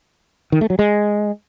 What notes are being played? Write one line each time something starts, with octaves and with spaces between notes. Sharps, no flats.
D#3
A3
F#3
G#3